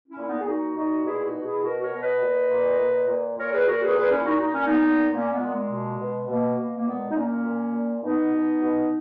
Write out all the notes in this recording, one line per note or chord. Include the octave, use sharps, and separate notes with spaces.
C#4 E4
A#2
B3 D#4
G#4
A#2 D#4 F#4
A#2 D#4 F#4
B2 E4 G#4
E4
D#4 F#4
B2
E4 G#4
B2 F#4 A#4
A#4 C#5
B2
B4 D#5
A#2
A#2
A#2
A#2
A#2 A#4 C#5
G#4 B4
A#2 F#4 A#4
G#4 B4
A#2 G#4 B4
C#4 E4
A#2 D#4 F#4
D#4
A#2 C#4
B3 D#4
A#2
A#2 A#3 C#4
G#3 B3
A#2
G#3
B2
B2
B2 A#3
B2
A#3
A#2 G#3 B3
D#4
A#2 A#3 C#4
A#2
A#2
B2 B3 D#4
B2
B2